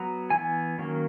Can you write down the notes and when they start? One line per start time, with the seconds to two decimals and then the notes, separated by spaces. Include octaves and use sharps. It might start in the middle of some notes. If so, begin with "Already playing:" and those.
Already playing: F#3 B3 A#5
0.30 E3 B3 G#5
0.78 D#3 F#3 A#3 C#4